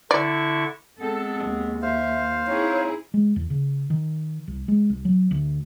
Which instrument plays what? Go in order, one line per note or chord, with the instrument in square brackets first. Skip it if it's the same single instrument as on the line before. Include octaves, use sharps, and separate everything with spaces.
[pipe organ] D3 E4 C#6 [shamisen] D5
[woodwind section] G#3 B3 C4 [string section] A4
[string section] D#2
[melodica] C5 F5 [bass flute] E5
[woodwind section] C4 D#4 [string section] E4 G#4 [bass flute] C#5
[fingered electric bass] G#3
E2
C#3
D#3
C2
G#3
C2
F#3
D2